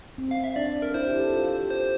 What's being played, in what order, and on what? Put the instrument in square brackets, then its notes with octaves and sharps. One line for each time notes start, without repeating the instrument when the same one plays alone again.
[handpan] C4
[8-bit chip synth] F5
E5
[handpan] D4 [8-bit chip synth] D5
[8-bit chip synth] A#4
[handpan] E4 [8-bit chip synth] C5
[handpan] G4
A4
F4
G4
[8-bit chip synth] C5